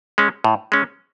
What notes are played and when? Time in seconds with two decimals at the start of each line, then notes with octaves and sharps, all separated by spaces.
0.18 G#3 C#4
0.44 A2
0.72 G#3 C#4